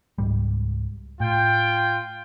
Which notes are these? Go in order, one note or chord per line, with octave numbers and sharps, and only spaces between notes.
C#2 G#2 G3
A2 F4 G5